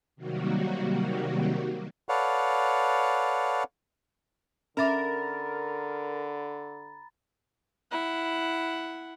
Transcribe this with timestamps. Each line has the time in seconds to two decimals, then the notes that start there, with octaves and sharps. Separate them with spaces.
0.16 C3 D#3 F#3 G3 A#3 F#4
2.09 A4 B4 C#5 D5 F5 F#5
4.77 D3 C#4 A#4 E5 A#5 B5 D6 A6
7.91 E4 F#5